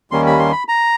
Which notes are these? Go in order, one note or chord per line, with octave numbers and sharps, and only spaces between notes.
D#2 D#3 G3 A#3 C#4 C6
B5
C6
B5
A#5